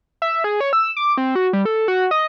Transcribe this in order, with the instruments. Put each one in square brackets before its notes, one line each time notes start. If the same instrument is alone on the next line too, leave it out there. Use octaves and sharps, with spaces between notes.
[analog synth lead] E5
G#4
C#5
E6
D6
C4
F#4
G3
A4
F#4
D#5